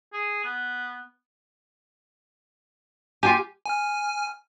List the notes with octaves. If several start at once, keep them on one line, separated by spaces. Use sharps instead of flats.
G#4
B3
F4 G4 G5 G#5
G#5 F6